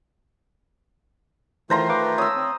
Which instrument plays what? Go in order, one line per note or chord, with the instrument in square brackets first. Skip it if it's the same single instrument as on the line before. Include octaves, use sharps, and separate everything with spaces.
[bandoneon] D#3 A3 F4 [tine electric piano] E3 [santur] C5 A#5 C6
[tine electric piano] B4 F5 D6
[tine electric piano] C#5 [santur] D#6 E6
[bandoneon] C4